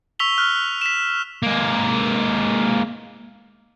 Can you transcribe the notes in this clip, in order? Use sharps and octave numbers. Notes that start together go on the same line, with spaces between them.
C#6 E6 B6 F7 G7
F6 F#6
B6 E7
G#3 A#3